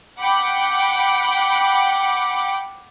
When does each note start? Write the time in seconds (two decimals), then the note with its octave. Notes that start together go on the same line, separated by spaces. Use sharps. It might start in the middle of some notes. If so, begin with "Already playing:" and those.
0.20 F#5 G5 B5 D6